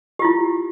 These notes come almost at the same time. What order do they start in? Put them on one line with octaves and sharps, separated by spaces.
G4 F4 E4